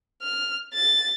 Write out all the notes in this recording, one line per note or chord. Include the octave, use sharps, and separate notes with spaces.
F6
A6